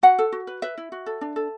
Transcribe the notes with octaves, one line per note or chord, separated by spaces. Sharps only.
F#4 F#5
A4
F#4
B4
B4 E5
E4
F#4
A4
D4
A4